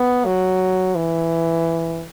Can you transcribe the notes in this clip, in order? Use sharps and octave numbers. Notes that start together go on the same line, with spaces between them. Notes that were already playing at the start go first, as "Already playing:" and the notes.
Already playing: B3
F#3
E3